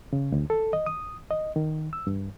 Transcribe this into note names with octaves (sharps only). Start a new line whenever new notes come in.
C#3
D2
A4
D#5
D#6
D#5
D#3
E6
G2